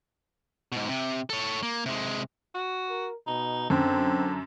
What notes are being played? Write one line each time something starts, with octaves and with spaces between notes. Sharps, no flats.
G#2 B2
C3
A4 C#5
A#3
C3 G#3
F#4
A#4
B2 D#4
F#2 D3 C4